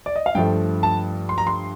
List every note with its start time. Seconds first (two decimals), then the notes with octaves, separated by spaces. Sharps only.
0.06 D5
0.16 D#5
0.26 F5
0.35 G2 F3 A3 G5
0.83 A5
1.29 C6
1.38 A#5
1.47 C6